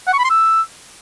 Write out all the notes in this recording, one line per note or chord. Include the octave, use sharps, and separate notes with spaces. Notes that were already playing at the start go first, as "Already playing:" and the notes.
F#5
C#6
B5
C6
E6